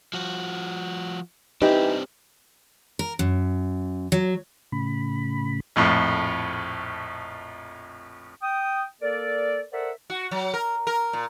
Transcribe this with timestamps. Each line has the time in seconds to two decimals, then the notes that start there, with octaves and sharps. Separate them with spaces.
0.14 F3 F#4
1.62 E3 C4 D4 D#4 G4
2.99 A#4
3.19 F#2
4.12 F#3
4.72 A2 C#3 B5
5.76 A#1 F2 A2
8.42 G5 D#6
9.02 A#3 A4 A#4 D5
9.73 A4 A#4 C5 D5 E5 F#5
10.10 F#4
10.31 F#3
10.54 A#4
10.87 A#4
11.13 A#2